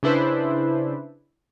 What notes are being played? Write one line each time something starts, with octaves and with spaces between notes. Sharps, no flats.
C#3 D4 E4 B4 C5